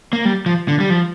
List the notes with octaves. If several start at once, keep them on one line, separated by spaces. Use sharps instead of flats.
A#3
G3
F3
D3
G3
F3